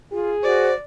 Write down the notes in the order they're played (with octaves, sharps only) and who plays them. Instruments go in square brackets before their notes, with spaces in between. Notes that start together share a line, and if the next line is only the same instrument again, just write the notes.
[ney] F4 [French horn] G#4
[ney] F#4 [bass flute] C5 [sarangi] D5